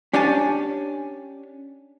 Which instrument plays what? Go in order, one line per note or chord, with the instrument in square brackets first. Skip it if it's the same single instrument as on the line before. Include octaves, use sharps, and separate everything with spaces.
[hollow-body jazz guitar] C#4 D4 G4 C#5 G#5 A5